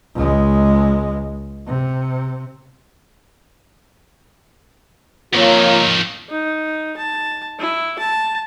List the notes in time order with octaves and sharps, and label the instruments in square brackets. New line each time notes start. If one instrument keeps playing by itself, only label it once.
[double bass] C#2 G#3
C3
[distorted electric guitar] F2 D#3 [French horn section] A#3 F4 C#5
[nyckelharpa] D#4
A5
E4
A5